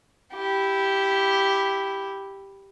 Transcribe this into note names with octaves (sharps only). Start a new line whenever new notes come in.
E4 G4